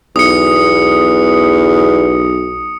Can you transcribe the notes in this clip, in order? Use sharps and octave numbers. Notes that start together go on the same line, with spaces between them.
B1 E2 D#6 C#7